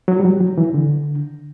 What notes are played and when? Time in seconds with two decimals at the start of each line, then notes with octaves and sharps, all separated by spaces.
0.08 F#3
0.20 G3
0.25 F#3
0.41 F#3
0.58 E3
0.74 D3